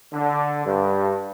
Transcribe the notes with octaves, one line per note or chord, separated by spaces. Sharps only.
D3
G2